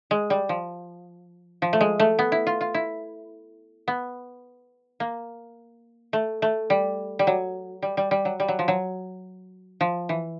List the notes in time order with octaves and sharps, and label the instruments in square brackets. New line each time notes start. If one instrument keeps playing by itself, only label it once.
[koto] G#3
G3
F3
F3
A3
G#3
A3
B3
E4
F4
F4
E4
B3
A#3
A3
A3
G3
G3
F#3
G3
G3
G3
F#3
G3
F#3
F3
F#3
F3
E3